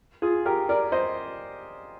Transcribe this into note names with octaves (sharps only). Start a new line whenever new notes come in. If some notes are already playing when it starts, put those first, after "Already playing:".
F4 G#4
G4 A#4
A#4 D5
C5 D#5